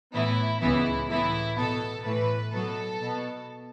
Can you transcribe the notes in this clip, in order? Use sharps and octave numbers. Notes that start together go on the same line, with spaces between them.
A2 E3 B3 E4
C#2 C#3 E3 B3 E4
A2 E3 B3 E4
B2 B3 A4
A2 E3 A3 B4
B2 F#3 B3 A4
B2 B3